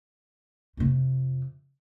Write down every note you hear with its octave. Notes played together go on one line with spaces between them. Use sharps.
F2 C3